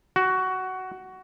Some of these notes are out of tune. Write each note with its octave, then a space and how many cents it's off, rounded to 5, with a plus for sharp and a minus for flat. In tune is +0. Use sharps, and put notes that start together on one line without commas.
F#4 +15